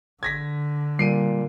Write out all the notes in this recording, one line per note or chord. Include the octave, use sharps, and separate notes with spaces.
D3 G#6 A#6 B6
A#2 G3 C7 D7 D#7